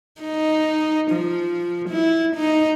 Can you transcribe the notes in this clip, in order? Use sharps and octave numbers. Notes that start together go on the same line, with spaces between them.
D#4
F3
E4
D#4